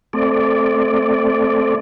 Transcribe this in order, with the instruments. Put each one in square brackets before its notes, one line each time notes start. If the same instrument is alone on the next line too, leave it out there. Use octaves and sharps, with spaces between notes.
[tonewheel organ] A3 C4 D5